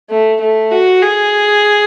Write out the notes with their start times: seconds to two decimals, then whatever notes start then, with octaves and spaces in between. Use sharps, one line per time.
0.10 A3
0.41 A3
0.72 F#4
1.02 G#4